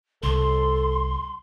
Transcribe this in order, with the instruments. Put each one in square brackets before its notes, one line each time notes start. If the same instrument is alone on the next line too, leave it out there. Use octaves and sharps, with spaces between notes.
[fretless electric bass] C2 [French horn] A4 [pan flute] C6